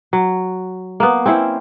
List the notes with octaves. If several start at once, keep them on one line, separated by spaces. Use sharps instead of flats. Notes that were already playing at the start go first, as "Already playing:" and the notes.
F#3
A#3 B3
C4 C#4 E4 C5